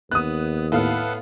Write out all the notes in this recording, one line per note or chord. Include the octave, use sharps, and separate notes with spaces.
D#2 B3 D#6 F#6
A2 B3 A4 B4 F5 F#5